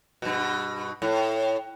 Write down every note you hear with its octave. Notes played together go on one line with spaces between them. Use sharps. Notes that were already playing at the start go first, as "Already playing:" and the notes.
G2 B2
A2